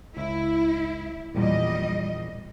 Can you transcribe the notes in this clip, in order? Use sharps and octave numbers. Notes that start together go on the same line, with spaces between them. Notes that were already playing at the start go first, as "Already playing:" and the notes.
C#2 E4
A#1 E2 A#2 G3 D#5